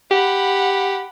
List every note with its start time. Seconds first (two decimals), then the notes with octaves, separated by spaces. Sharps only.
0.11 G4 F#5 B5